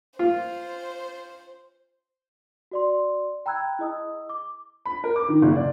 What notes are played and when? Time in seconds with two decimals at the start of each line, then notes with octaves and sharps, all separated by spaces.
0.19 F4 C5
2.71 F#4 D5 C6
3.46 G5 A#5 B5 E6 F#6 G#6
3.79 E4 G#4 D#5 D#6 E6
4.29 D6
4.86 B5
5.04 A#4
5.16 D6
5.29 D#3
5.42 F#1
5.55 D5